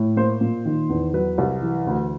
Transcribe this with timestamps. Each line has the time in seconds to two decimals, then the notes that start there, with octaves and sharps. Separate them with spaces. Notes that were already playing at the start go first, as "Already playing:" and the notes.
Already playing: A2
0.17 A#3 C5
0.41 A#2
0.65 D#3
0.89 E2
1.13 F#3 B4
1.38 C2
1.61 E3
1.87 D2